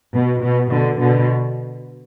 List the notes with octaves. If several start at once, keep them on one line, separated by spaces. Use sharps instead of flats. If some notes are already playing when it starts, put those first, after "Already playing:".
B2
B2
B2 D3
B2 D3